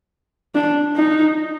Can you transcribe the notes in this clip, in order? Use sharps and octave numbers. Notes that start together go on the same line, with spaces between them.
D4
D#4